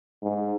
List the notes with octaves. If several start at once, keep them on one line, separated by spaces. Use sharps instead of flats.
G#2